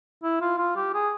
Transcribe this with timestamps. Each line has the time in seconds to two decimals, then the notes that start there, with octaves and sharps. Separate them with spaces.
0.23 E4
0.41 F4
0.58 F4
0.76 G4
0.94 G#4